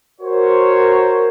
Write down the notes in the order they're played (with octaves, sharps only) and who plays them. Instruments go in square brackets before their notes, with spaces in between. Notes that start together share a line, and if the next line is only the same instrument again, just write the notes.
[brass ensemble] F#4 A#4 C5 C#5